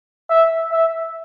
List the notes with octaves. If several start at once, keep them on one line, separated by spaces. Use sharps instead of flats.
E5
E5